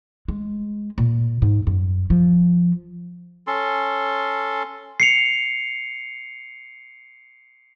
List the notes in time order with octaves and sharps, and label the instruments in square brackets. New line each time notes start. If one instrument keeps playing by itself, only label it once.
[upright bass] G#3
A#2
G#2
F#2
F3
[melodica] C#4 A4 C6
[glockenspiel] C7 C#7 F7